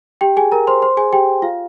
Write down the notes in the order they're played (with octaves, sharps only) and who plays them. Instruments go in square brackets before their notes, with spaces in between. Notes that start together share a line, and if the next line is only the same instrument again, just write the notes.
[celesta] G4 G5
G#4 G#5
A#4 A#5
C5 C6
C5 C6
G#4 G#5
G4 G5
F4 F5